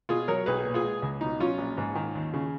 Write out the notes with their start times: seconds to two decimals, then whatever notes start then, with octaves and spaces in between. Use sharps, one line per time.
0.09 B2 F4 G#4
0.28 F#3 A#4 C#5
0.46 B1 G#4 B4
0.65 A#2
0.74 F4 G#4
0.84 G#3
1.02 C#2
1.21 B2 D#4
1.40 F#3 C#4 F4
1.58 A#1
1.78 G#2
1.95 D#3
2.15 D#2
2.34 C#3